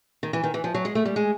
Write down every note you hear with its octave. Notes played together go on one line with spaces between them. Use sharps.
D#3
E3
D#3
E3
F3
F#3
G#3
A3
G3
G#3